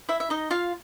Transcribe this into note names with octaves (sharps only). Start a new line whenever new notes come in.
E4 E5
E5
D#4 D#5
F4 F5